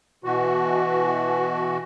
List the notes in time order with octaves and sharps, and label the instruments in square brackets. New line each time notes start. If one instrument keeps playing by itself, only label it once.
[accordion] B2 E3 F#4